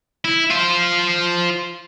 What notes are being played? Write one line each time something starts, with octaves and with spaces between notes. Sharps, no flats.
E4
F4 C5